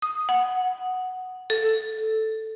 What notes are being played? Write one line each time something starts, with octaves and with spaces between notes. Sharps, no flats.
D#6
F#5
A4